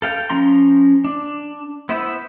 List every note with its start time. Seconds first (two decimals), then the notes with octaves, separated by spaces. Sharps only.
0.02 A4 F5 G5
0.30 F3 C#4 A#5 C6
1.05 D4
1.89 B3 E4 C5 E5